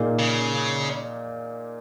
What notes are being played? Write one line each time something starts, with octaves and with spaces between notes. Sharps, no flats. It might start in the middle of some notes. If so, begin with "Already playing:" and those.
Already playing: A#2 A#3 D#4 G#4
C#3